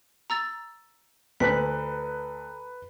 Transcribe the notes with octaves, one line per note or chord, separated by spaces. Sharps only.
A#5 E6 A6
D2 D4 A4 B4 A#5 F#6 B6